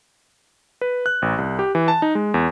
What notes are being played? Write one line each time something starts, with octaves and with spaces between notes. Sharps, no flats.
B4
F#6
A1
C2
G4
E3
A5
D#4
G#3
E2